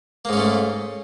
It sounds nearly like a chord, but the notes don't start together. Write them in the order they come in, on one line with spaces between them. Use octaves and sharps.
A#3 G#2 C#4 A3